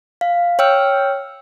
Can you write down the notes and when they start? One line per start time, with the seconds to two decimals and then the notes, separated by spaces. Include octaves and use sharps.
0.21 F5
0.59 C#5 G5 E6 F6